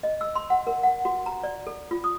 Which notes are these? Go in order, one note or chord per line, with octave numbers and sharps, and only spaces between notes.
D#5
E6
C6
F#5
A#4
F#5
F#4
A#5
D5
A4
F4
D#6